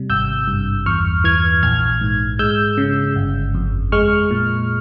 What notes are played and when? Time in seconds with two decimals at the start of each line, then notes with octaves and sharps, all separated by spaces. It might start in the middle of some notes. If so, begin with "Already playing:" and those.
Already playing: C3 G3
0.10 G#1 E6 G6
0.48 G2
0.86 E2 C#6 F6
1.24 E3 F6 G#6
1.63 A#1 F6 G#6
2.01 G#2
2.39 G#3 E6 G6
2.78 C#3
3.16 G1
3.54 F2
3.92 G#3 C#6 F6
4.31 A#2